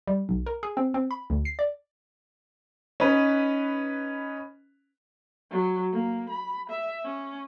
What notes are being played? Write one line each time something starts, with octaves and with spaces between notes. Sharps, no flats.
G3
B1
A#4
G#4
C4
C4
B5
D2
C7
D5
C#4 D#4 B4
F#3
A#3
B5
E5
C#4